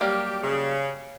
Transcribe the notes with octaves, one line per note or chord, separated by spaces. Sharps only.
F#3 G3 A#3 G4
C#3